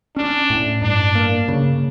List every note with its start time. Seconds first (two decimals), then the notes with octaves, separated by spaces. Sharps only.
0.16 C#4 D4
0.50 A2
0.82 G2 D4
1.15 A#3
1.48 C#3